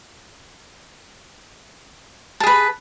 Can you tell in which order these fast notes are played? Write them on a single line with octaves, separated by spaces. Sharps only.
A5 G#4 B4